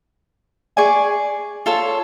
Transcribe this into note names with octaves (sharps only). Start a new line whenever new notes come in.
G#4 D5 G#5 C#6
F4 A4 C#5